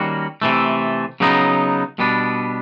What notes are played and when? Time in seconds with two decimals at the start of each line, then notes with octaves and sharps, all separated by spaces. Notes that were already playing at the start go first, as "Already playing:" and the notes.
Already playing: D#3 G3 A#3 C#4 F#4
0.42 C3 E3 A3
1.20 C#3 F#3 B3 D#4
1.99 B2 G3 B3 D4